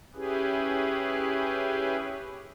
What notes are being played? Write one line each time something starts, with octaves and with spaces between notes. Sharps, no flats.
C#4 E4 G4 G#4 B4